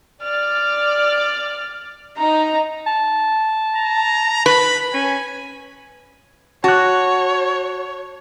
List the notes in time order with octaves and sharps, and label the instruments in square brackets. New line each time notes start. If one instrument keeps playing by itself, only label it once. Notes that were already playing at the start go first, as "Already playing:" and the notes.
[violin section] D5 [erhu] F6
[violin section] D#4 [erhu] A#5
[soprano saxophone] A5
[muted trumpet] A#5
[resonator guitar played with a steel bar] B4 [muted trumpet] B5
[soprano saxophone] C#4 [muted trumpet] G#5
[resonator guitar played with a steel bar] F#4 [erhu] C#5 [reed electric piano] A5 F#6